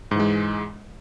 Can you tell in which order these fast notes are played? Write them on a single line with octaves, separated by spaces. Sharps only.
G#2 E3 G#3